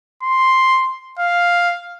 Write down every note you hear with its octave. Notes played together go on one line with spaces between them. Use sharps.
C6
F5